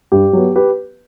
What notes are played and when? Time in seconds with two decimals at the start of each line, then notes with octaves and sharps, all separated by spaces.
0.12 G2 G4
0.33 F#3 B3
0.56 G4 B4